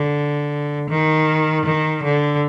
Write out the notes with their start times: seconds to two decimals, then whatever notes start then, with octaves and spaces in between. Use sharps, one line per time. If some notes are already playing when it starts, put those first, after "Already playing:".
Already playing: D3
0.90 D#3
1.65 D#3
2.03 D3